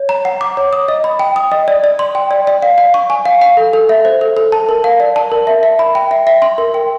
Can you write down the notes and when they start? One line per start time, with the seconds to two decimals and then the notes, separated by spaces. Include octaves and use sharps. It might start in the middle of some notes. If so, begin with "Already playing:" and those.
Already playing: C#5
0.09 A#5
0.25 F#5
0.41 D6
0.57 C#5
0.73 D#6
0.88 D#5
1.04 B5
1.19 G5
1.36 D#6
1.52 D#5
1.68 D5
1.84 D5
1.99 C6
2.15 G5
2.31 D5
2.47 D5
2.62 F5
2.78 F5
2.94 C#6
3.10 G#5
3.26 F5
3.41 F5
3.57 A4
3.73 A4
3.89 E5
4.05 C5
4.21 A4
4.37 A4
4.52 A5
4.69 A#4
4.84 F5
5.00 D5
5.16 A5
5.32 A#4
5.47 E5
5.63 E5
5.79 B5
5.95 G5
6.11 E5
6.27 E5
6.42 C6
6.58 A#4
6.74 G5